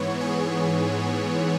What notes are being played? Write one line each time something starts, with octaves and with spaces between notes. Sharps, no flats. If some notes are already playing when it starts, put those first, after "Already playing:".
Already playing: G#2 E3 B3 C#5
G#4